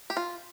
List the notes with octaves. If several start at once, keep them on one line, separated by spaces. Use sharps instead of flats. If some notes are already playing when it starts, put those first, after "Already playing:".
G4
F4